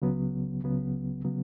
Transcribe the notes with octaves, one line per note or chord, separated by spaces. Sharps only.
C#2 C#3 F#3 B3
C#2 C#3 F#3 B3
C#3 F#3 B3